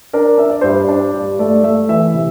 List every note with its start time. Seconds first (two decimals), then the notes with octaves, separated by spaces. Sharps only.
0.13 D4 A#4
0.38 D4 E5
0.50 D5
0.61 G2 C5
0.72 D5
0.89 D4
1.14 G2
1.39 A3 D5
1.64 A3 E5
1.89 E3 E5
2.14 C3